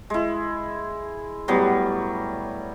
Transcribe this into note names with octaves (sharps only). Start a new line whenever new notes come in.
G#3 E4
A2 F#3 G3 B3